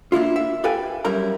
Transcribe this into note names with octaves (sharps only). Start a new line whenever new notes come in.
A#3 D4 E4 F4
E5
G4 A4 B4 F5 G5 G#5
F#2 G3 E4 A#4 A#5